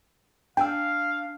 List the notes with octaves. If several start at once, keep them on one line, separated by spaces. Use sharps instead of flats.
D4 F5 G5 G#5 E6